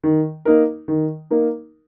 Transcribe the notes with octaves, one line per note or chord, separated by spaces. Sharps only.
D#3
A#3 D#4 A#4
D#3
A#3 D#4 A#4